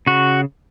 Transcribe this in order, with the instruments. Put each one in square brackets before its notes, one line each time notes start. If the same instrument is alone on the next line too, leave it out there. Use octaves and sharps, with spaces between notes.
[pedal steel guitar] C#3 F#4